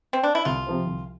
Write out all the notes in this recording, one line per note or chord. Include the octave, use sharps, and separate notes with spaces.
C4
D4
E4
C2 F4
C3 F3 C4
C2